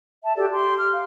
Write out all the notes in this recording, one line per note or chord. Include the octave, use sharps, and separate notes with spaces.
E5 A5
F#4 G4 A4 D5
G4 C6
F6
F5